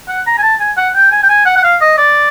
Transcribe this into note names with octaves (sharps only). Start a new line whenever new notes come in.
F#5
A#5
G#5
A5
G#5
F#5
G5
G#5
G5
G#5
F#5
F#5
F5
D#5
D5